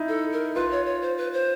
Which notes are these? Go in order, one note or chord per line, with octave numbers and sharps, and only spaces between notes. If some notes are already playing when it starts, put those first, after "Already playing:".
Already playing: D#4 E4
A4
A#4
F4 B4
C#5
C#5
C5
B4
C5